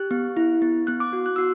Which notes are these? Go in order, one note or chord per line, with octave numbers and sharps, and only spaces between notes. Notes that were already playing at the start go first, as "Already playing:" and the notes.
Already playing: G4 F#6
B3
E4
B3
B3 F#6
D6
F#4
F#6
F#4 E6